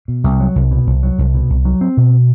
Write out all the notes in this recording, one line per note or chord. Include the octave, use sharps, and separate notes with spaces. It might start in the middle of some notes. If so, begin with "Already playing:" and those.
B2
C2
F#3
C2
B2
C2
F#3
C2
B2
C2
F#3
C4
B2